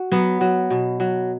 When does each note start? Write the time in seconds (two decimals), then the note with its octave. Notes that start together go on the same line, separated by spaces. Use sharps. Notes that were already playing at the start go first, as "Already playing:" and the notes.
Already playing: F#4
0.12 F#3 B3
0.41 F#3
0.70 B2
1.00 F#3